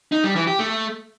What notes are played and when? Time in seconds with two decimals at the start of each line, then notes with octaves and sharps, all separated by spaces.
0.12 D#4
0.24 G3
0.36 E3
0.47 G4
0.59 A3